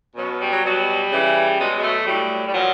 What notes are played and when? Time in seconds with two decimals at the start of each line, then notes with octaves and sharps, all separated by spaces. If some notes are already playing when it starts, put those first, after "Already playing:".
0.15 B2 F#3 C#4
0.40 G3
0.53 F#3
0.63 B2 F#3 G3
1.11 C#3 E3
1.58 B2 F#3 G#3
1.78 G#3
1.82 A3
2.06 A2 F#3 G3
2.47 G3
2.53 A#2 F3 F#3